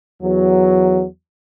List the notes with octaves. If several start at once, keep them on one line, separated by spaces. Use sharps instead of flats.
E2 F#3